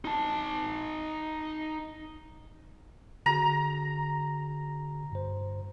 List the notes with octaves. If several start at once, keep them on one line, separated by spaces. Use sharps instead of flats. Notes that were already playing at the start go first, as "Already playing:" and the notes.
D#4 A5
D3 F#4 G#4 A#5
G2 C5